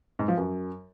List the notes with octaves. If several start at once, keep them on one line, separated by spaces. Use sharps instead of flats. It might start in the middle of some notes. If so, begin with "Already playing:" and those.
G#2
F3
F#2